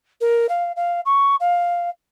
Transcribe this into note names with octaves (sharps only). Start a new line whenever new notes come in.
A#4
F5
F5
C#6
F5